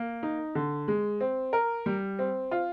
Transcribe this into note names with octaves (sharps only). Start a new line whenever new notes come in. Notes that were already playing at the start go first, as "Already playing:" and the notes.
Already playing: A#3
D#4
D3
G#3
C4
A#4
G3
C4
F4